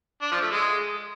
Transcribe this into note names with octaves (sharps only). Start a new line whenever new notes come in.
D4
F3
A3
G#3